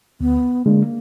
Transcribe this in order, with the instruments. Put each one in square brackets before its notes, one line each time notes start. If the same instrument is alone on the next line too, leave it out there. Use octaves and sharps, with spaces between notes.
[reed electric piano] D2 [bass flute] B3
[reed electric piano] D3 G#3 D4 [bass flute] A#3